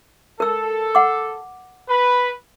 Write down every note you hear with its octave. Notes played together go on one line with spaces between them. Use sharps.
A4 A#4 E6
F#5 D6
B4 B5